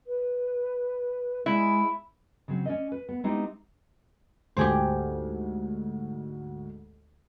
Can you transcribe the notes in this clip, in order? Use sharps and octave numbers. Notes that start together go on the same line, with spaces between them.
B4
G#3 E4
C#3 F#3 C4
C#4 D5 D#5
B4
B3
G#3 B3 C4 D#4 E4 G4
D2 G#2 G4 G#4 C5